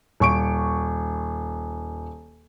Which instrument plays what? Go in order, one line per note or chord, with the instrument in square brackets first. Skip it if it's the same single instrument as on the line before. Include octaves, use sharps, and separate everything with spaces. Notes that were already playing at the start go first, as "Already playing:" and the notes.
[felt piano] D#1 C#6 D7